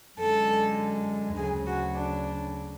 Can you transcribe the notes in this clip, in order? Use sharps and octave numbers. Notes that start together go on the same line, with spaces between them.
F#2 D3 G#3 A4
D2 C#3 F#3 G#4
F#4
D4